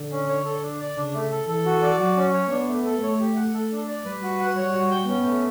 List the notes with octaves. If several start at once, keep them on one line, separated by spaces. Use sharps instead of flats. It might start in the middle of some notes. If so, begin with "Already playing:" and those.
Already playing: D3
C#4
C#5
A4
D4
D5
C#3 D4
A3
A4
E3 A4
F#4
D5
F#3 F#4
C#4
C#5
B3 D4
A3
A4
A3 C#5
G4
F#5
A4
D4
D5
G3 B4
F#4
F#5
G3 C#5
F#4
G5
B3 C#4
A3